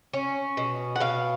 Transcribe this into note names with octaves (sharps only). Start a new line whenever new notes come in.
C#4
B2
F#5
B2 F5